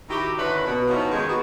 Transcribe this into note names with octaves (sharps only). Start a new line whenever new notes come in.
D#3 D#4 E4 F#4 G4
D3 D#3 C#4 D4 E4 B4
B2
F3 B3 C#4 D#4 E4 F#4
D#3 G#3 G#4
B3 F#4